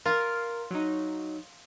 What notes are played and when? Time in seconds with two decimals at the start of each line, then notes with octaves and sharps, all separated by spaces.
0.05 F4 A#4 F5
0.71 F#3 D#4